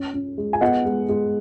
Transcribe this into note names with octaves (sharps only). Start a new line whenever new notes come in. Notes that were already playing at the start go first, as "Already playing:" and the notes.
Already playing: C#4
C#4
G#3
G#5
B3 D#5 F#5
G#3
G#3